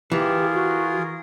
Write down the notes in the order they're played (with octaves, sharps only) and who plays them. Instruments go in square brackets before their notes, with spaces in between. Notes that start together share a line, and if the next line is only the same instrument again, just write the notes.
[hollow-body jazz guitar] E3 [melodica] F4 G#4 A#4 [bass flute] G4
[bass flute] F#4